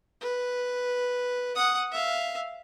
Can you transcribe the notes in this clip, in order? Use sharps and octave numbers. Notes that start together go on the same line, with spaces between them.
B4
F#5 D#6
E5 F5